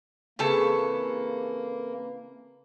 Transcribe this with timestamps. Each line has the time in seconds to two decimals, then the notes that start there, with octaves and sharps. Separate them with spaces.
0.39 C#3 E3 A#3 C4 A4 B4 B5 C#6